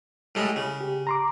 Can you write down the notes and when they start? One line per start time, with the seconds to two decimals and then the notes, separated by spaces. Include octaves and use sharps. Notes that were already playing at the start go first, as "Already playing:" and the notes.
0.35 A2 G3 G#3
0.56 C#3
0.81 G4
1.07 A#5 C6 D6